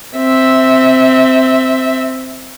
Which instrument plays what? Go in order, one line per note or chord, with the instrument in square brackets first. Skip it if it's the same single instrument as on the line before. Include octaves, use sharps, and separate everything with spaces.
[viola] C4 E5